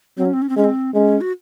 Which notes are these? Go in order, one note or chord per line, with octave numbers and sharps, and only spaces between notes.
F#3 C4
C#4
C4
C#4
C4
G#3 C#4
C4
G#3 C#4
F#4